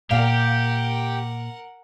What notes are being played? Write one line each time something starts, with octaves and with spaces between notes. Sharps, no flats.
A#2 G4 A#4 F5 F#5